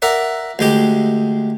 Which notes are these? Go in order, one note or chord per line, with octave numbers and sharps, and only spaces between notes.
A#4 D5 E5 F#5
D2 G#3 G4